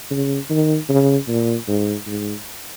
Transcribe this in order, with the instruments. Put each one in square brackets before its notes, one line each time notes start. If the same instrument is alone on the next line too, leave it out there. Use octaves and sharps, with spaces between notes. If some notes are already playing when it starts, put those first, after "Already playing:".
[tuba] C#3
D#3
C#3
A#2
G#2
G#2